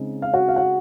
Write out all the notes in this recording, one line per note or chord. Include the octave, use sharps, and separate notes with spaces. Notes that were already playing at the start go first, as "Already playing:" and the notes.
Already playing: C#3 G#3 C4 D#4
F5
F#4 F#5
F5
F#4 F#5